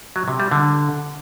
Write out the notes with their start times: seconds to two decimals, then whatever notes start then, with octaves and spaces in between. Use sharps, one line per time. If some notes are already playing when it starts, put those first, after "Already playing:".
0.16 F#3
0.28 C3
0.40 G3
0.51 D3